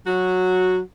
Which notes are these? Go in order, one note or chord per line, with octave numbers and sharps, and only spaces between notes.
F#3 F#4